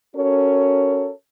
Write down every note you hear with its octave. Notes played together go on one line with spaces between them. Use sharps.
C#4 F#4 A4 A#4 C#5